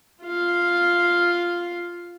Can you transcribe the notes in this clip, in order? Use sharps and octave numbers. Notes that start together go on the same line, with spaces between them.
F4 F5